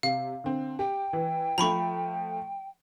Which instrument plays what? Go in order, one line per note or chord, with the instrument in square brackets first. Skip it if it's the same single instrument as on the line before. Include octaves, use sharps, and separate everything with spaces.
[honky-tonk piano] C3 [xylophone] F5
[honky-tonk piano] D3 C4
[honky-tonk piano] G4 [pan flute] G5
[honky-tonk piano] E3
[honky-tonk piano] F3 A3 [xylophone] A#5 B5 C#6